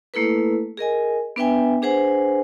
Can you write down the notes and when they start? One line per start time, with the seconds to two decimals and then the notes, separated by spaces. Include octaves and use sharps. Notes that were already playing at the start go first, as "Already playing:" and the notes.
0.14 A3 A#3 E4 A4 B4
0.77 G#4 A#4 D#5 G#5
1.36 B3 D4 B4 E5 G5 G#5
1.82 D4 G#4 B4 C5 F#5 G#5